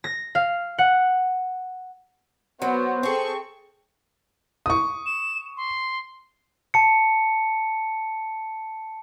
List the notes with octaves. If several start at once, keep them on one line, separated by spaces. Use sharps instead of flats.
A#6
F5
F#5
F#3 B3 F#4 C5
C4 G#4 A4 G5 C#6
C#6 D#6
E7
C6
A5 C#7